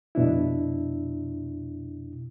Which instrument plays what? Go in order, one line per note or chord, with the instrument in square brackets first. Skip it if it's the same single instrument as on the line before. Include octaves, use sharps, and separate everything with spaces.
[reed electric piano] F2 B2 D4 E4